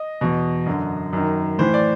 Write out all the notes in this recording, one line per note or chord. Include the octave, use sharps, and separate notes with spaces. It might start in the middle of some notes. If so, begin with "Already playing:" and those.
Already playing: D#5
E2 B2
F#2 D3
F#2 D#3
A2 E3 C5
D5